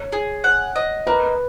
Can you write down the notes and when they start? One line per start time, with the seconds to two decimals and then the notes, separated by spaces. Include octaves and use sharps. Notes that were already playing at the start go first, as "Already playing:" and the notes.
Already playing: C#5
0.12 G#4
0.44 F#5
0.76 D#5
1.07 A#3 B4